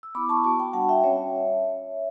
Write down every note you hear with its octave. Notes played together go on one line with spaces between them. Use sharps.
E6
B3 E4 B5 D6
A5 C#6
B3 F#4 A5 C#6
G5 B5
G3 D4 F#4 F#5 A5
E5 G5
G3 C#4 F#4 C#5 E5